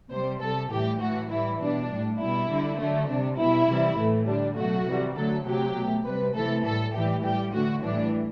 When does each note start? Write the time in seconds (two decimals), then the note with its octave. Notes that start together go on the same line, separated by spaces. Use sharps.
0.11 C3 G3 C5
0.41 C3 G3 A4
0.71 A2 E3 G3 G4
1.00 A2 E3 A3 F#4
1.30 A2 E3 G3 E4
1.60 B2 G3 D4
1.90 A2 G3
2.19 B2 G3 E4
2.49 D3 G3
2.78 D3 F#3 A3
3.08 C3 G3 D4
3.37 B2 G3 E4
3.68 C3 E3 G3
3.97 A2 E3 A3
4.27 D3 G3 D4
4.56 B2 F#3 A3 F#4
4.86 C3 E3 G3
5.16 D3 F#3 A3 A4
5.45 C3 F#3 A3 G4
5.75 B2 A3
6.05 C3 G3 B4
6.34 C3 E3 A3 A4
6.64 A2 G3 A4
6.94 A2 E3 G3 G4
7.23 A2 G3 G4
7.53 D3 A3 F#4
7.83 A2 E3 G3 D4